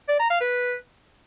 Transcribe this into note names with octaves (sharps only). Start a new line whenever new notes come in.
D5
A#5
F5
B4